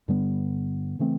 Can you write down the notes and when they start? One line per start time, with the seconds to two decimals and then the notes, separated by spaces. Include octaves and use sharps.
0.08 G2 D3 G3 B3
0.99 C#3 E3 A3 C4